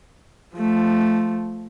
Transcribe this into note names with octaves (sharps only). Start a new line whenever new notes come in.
F3 A3